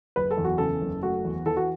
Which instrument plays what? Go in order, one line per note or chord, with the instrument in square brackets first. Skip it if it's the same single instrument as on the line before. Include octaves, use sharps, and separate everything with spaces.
[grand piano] F#1 B4
A4
E2
F#4
C#3 A4
F#1
A3 F#4
E2
E3 A4
F#4